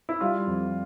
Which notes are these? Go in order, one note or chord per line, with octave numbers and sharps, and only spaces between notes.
E4
G3 F4
F2